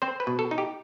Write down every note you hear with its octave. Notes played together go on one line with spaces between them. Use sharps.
C4 C5
B4
B2
A4
D#4
G4